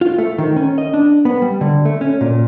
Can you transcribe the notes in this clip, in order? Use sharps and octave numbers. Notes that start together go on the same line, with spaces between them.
F4
A3
D#3
C#4
D#5
D4
B3
G3
D3
A3
C#4
A#2